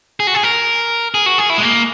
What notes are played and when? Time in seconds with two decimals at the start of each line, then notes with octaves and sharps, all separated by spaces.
0.20 G#4
0.27 F#4
0.35 G#4
0.43 A#4
1.14 G#4
1.26 F#4
1.38 G#4
1.50 E4
1.58 G#3
1.62 A#3